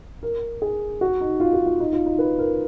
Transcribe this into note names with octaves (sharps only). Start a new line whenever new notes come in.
A#4
G#4
F#4
D#4
F4
F#4
F4
D#4
F4
D#4
B4
A#4